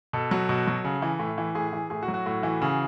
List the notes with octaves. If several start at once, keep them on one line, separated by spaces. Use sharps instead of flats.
B2 A4
F#3
B2
F#3
C#3
E3
A2
E3
A2 G#4
E3
A2 G#4
F#4
F#3
F#4
A2
E3
C#3